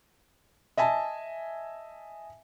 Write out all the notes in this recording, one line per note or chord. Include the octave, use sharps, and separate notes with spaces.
D#5 E5 G#5 A5